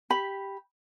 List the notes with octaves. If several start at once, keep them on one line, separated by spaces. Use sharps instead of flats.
G4 B5